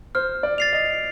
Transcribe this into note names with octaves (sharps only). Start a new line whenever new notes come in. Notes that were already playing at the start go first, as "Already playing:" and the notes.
C5 F6
D5
A6 C7 F7
D#5